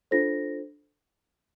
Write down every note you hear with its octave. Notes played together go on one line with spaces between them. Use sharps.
D4 F4 A4 C5 A#6